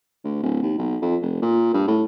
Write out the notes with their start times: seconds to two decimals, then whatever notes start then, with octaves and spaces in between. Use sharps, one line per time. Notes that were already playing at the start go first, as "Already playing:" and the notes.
0.24 D2
0.43 D1
0.62 D#2
0.78 B1
1.02 F2
1.22 F1
1.42 A#2
1.74 G2
1.88 A2